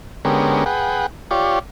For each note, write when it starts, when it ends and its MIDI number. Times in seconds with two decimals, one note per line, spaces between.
0.25 0.64 50
0.25 0.64 56
0.25 0.64 59
0.25 0.64 61
0.25 0.64 67
0.25 0.64 70
0.66 1.06 68
0.66 1.06 71
0.66 1.06 78
0.66 1.06 79
1.31 1.59 65
1.31 1.59 67
1.31 1.59 73
1.31 1.59 74